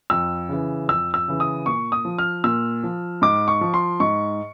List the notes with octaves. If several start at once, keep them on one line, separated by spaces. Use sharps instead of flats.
F2 E6
C#3 E3
F2 E6
E6
C#3 E3
D#6
A#2 C#6
D#6
F3
F6
A#2 E6
F3
G#2 D6
C#6
F3
C6
G#2 C#6